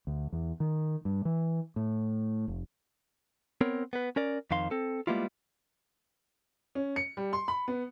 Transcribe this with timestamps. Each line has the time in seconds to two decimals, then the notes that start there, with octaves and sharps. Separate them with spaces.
0.07 D2
0.33 E2
0.60 D#3
1.05 G2
1.25 E3
1.76 A2
2.48 F1
3.61 B3 C4 A#4 C#5
3.93 B3 B4
4.16 C#4 A#4 D5
4.51 F2 D#3 F5 C6
4.71 C4 A4
5.07 G3 G#3 A#3 B3 E4 F4
6.75 C#4
6.96 C#7
7.17 G3
7.33 C6
7.48 B5
7.68 B3